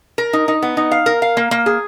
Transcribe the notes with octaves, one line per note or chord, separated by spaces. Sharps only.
A#4
D#4
D#4
B3
D#4
F5
A#4
F5
A#3
A#3
G#4